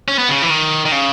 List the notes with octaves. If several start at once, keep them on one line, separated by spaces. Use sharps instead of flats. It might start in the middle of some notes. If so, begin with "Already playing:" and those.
C#4
B3
C#3
E3
D#3
D#3
C#3